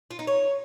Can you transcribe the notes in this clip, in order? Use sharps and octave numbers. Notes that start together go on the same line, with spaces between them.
F4
D#4
C#5